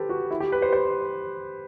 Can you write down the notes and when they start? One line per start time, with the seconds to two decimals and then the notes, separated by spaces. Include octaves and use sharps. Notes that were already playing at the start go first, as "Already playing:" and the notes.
Already playing: G4 A4 B4 C5
0.09 F#4
0.31 E4
0.40 G4
0.52 B4
0.62 C5
0.73 C5